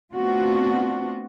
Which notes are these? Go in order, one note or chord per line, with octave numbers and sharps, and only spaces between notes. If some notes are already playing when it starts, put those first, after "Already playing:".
A3 B3 C4 D4 F4 F#4